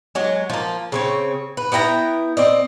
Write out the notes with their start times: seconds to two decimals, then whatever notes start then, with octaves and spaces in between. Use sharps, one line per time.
0.15 F#3 G#3
0.50 F3 A#3
0.92 C#3 C4 C#5
1.57 B4
1.72 B3 E4 G5 A#5
2.37 C4 D5 D#5